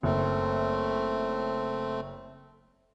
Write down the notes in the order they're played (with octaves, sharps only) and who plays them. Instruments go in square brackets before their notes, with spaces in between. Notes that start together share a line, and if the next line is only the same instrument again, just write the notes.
[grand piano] F#1 [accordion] A3 C4